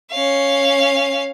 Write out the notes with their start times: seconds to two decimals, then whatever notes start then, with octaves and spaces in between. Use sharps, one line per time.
0.11 C#4 F5